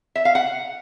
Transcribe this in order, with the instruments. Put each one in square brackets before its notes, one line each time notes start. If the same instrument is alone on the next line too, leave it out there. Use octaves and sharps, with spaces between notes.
[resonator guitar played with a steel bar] E5
F5
F#5